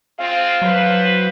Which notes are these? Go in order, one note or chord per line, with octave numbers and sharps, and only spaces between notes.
G#3 C4 F4 F5
A2 F#3 B4 C5